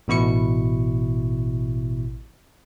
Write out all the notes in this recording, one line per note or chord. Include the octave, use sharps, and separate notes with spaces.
A1 B2 E4 C#6 C#7